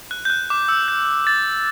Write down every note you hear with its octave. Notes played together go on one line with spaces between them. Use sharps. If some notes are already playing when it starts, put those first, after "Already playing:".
F#6
G6
F#6
D6
E6
G6
A6